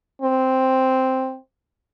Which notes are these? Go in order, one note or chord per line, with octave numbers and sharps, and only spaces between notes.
C4